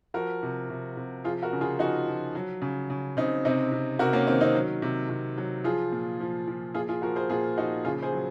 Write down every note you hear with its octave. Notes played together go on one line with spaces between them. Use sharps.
F3 F#4 A#4
C3
C3
C3
F3 F4 G#4
F#4 A#4
C#3
F4 G#4
F3 D#4 F#4
F3
F#3
C#3
C#3
C#3 C4 D#4
C3 C4 D#4
C3
C3 F#4 A#4
A#3 C#4
D#3 C4
C4 D#4
F#3
C3
C3
F#3
F3 F4 G#4
A#2
F3
F3
A#2 F4 G#4
F4 G#4
F3 F#4 A#4
G#4 C5
A#2 F4 G#4
F3 D#4 F#4
C#3 F4 G#4
G#4 C5
F#3